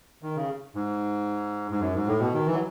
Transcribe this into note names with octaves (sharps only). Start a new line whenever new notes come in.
D#3
C#3
G#2
G#2
F#2
G#2
A2
B2
D#3
E3
F#3